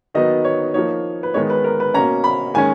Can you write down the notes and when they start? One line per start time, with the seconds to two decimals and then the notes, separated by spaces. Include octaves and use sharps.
0.14 D#3 F#3 B3 D#4 D#5
0.44 C#5
0.74 F3 A#3 D#4 C#5
1.23 B4
1.34 D#3 G#3 B3 D#4 C#5
1.50 B4
1.64 A#4
1.80 B4
1.94 B2 A#3 C#4 A#5
2.24 B5
2.54 D#3 G#3 C#4 G#5